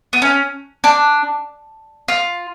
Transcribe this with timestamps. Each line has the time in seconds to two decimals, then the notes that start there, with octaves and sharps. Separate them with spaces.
0.13 B3
0.22 C#4
0.84 D4
2.08 F4